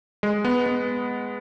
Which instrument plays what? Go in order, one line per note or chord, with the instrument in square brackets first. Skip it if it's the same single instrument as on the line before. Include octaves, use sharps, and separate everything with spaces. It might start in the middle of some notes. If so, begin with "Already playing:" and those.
[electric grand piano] G#3
B3
B3